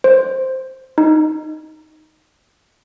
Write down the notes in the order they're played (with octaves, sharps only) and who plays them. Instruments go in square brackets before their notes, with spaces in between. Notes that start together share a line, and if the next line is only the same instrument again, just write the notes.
[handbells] C5
D#4